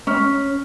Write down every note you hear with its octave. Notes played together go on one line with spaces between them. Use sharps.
C#4